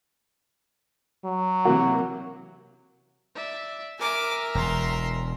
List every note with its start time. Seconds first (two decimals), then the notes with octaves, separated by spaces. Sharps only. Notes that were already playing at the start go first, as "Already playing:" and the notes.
1.25 F#3
1.65 C3 E3 A#3 F#4
3.36 D5 E5
3.99 A#4 E5 G#5 D6
4.55 E1 A#5 C6